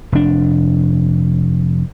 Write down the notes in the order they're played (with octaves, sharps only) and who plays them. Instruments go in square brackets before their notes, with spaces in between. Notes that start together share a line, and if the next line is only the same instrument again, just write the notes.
[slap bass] F1 D4